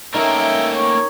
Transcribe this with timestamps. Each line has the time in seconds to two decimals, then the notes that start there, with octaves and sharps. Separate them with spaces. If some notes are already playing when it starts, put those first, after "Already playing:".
0.14 A3 A#3 C#4 D#4 A#4 E5 G5
0.71 C#5